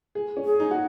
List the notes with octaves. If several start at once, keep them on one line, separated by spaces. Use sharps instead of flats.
G#4
C#4
G#4
D#4
F#4